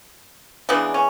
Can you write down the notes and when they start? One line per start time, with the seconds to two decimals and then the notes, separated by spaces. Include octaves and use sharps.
0.69 C#3 E3 G#3 B3 D4
0.94 C#4